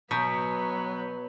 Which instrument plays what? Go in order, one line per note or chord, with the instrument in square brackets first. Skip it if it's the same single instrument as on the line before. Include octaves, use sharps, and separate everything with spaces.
[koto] B2 [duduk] F#3 [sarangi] B3 [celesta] A#5 G6